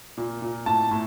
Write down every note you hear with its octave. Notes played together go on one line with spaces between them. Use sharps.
A#2
A#2
A2 A5
A2